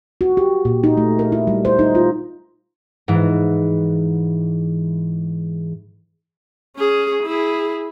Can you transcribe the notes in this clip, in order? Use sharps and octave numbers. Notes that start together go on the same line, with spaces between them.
F#4
G4
A#2
D#4
A3
A#4
E4
G3
C5
D#4
F4
G#2 E3
C#4 G#4
E4 G#4